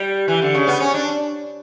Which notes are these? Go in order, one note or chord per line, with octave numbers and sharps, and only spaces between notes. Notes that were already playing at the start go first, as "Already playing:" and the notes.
Already playing: G3
E3
D3
C#3
B3
C#4
D4